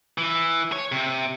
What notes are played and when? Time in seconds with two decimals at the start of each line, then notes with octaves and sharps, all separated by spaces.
0.18 E3
0.72 C#5
0.92 C3